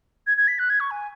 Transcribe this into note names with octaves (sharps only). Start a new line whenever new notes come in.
G#6
G#6
B6
F#6
G#6
C#6
G#5